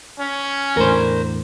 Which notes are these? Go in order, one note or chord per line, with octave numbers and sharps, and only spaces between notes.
C#4
E2 A2 D3 A#4 C5